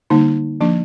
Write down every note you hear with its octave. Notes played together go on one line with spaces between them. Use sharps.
D3 G3 A#3 D#4
F3 A#3 D4